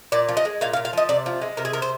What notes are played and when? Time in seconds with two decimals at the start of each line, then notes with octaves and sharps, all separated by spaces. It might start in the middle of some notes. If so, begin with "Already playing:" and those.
0.12 A#2 D5
0.29 F3
0.37 D#5
0.45 G#3
0.61 A#2 F5
0.73 F5
0.77 A#2
0.85 F5
0.93 F3 D#5
1.09 C3 D5
1.26 F3
1.42 G#3
1.57 C3 A#4
1.65 G#4
1.73 C3 A#4
1.82 C5